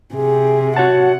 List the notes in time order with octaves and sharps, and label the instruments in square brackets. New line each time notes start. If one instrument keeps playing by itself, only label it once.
[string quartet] C3 [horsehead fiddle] G#4
[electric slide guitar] F#4 C#5 A5 [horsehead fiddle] F#5